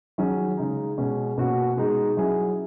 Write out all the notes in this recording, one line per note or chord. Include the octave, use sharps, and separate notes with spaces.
D#3 F#3 C#4 G#4
C#3 G#3 D#4
B2 G#3 C#4
B2 A#3 C#4 F#4
B2 G#3 D#4 G#4
F#3 C#4 E4 G#4